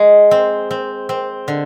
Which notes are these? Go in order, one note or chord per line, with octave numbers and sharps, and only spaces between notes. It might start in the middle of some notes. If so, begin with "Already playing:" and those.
Already playing: G#3
C4
C4
C4
D3